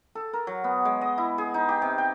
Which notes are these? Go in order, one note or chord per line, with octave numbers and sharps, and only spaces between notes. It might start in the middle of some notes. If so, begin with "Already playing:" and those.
A4
A#4
F#3
B3
G#3
D#5
E4
G#4
D#4
G4
C3
G5